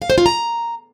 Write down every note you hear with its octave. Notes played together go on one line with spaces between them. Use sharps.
F5
C5
F4
A#5